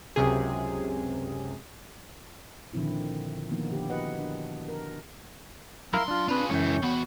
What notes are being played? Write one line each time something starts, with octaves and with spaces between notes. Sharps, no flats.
C#2 F#2 C3 G#4
A#2 D3 D#3 F3 C4 E4
D#3 F3 A#3 B3 D#4
D3 G4
E4 F#4 G4 B4 D#5 F#5
D4
A#4
F#2 E4 A#4 F5 C6
D4 F4
C4 D4 F4 G#4 B4
C#2 F#2 E3 C#5 G5
E2 B3 F#4